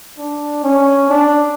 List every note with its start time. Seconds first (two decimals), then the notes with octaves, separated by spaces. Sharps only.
0.18 D4
0.64 C#4
1.09 D4